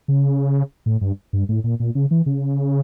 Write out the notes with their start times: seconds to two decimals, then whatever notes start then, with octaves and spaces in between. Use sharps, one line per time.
0.08 C#3
0.86 A2
1.01 G2
1.33 G2
1.49 A2
1.64 A#2
1.80 A#2
1.95 C#3
2.11 E3
2.26 C#3